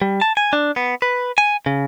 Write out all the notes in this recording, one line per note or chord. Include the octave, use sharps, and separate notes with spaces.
G3
A5
G#5
D4
B3
B4
G#5
C#3